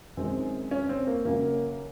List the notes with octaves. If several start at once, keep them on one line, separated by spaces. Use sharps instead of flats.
F#2 D#3 G#3 C4
C#4
C4
A#3
F#2 C#3 F#3 A#3